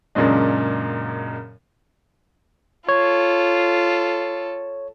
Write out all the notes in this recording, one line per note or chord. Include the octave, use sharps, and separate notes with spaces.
F#2 A#2 C#3 G#3 D4
F4 A4 C#5